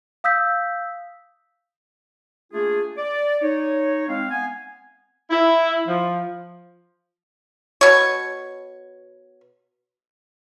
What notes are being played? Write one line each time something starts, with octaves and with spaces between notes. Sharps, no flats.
F5 D#6 E6 G6 B6
A3 A#3 D4 F4 G#4
D5
D#4 C#5
G#3 C4 F5
B3 G#5
E4
F3
B2 C#5